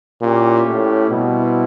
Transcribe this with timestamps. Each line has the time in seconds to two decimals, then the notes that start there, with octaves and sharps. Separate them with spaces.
0.22 A#2 C#4 E4 G4
0.66 A2
1.10 B2 G3 C4 E4